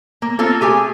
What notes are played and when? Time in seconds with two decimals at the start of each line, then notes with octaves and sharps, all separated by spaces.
0.22 A#3
0.39 A#3 C4 F4 A4
0.61 A3 G4 G#4 G#5